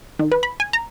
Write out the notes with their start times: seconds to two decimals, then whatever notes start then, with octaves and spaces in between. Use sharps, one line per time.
0.19 D#3
0.32 B4
0.43 B5
0.60 G#5
0.73 A#5